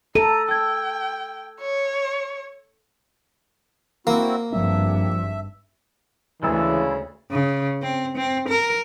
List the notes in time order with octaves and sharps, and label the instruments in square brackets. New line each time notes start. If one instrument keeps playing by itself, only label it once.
[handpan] A4 [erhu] A#5 [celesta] D#7
[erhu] G5 [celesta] E6 G#6
[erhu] C#5
[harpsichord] A#3 [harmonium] C4 E4 F#4
[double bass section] G#1 G2 [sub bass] F3 [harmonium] E5
[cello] D2 [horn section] C#3 [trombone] E3 [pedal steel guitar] G#3 E4 E6
[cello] C#3
C4
C4
A#4